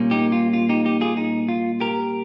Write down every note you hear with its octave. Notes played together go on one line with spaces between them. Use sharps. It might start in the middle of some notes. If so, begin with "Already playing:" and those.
Already playing: A#2 G3 A#3 C#4
D#4 G4
F4
F4
D#4 G4
D#4 G4
F4 G#4
D#4
F4
G4 A#4